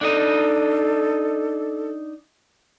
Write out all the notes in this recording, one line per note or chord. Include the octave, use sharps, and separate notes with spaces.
D4 D#4 A4 D#5